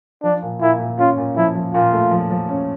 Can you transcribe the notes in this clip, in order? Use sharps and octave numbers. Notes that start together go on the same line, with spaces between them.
F3 D4
A#2
A#2 E4
A#2
C#4 F4
A#2
F3 E4
F3
A#2 F4
A3
F3
F3
C#4